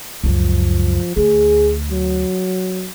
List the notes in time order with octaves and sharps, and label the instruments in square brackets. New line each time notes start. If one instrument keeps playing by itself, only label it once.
[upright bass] C#2 F#2 [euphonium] F3
[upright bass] D2 [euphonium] G#4
[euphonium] F#3